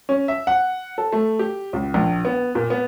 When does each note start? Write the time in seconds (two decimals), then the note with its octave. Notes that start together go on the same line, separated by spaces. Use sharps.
0.09 C#4
0.28 E5
0.47 F#5
0.98 A4
1.12 A3
1.39 G4
1.73 C#2
1.94 A#1
2.25 B3
2.55 A#2
2.70 B3